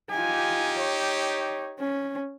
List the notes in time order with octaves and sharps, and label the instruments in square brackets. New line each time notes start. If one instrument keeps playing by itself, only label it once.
[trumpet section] D#4 G4 [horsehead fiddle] F4 G#5
[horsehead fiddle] C#5
C#4